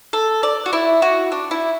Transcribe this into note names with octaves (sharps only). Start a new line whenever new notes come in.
A4
D5
F#4
E4
F#4
D4
E4